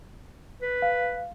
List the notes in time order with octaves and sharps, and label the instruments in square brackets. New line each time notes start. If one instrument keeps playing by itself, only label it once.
[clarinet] B4
[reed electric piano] F5